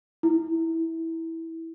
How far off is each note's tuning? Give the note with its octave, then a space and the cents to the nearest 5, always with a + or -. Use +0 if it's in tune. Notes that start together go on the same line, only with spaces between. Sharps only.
E4 -10